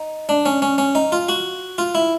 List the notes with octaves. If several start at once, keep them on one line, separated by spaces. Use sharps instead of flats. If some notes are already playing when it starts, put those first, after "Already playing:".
Already playing: D#4
D4
C#4
C#4
C#4
D#4
F4
F#4
F4
E4